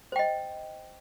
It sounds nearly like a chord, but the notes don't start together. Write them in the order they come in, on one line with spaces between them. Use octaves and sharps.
C5 G5 D#5